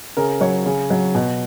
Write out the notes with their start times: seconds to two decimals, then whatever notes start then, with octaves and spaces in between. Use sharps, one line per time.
0.17 C#3 A#4
0.41 F#3 C#5
0.66 C#3
0.90 F#3
1.15 B2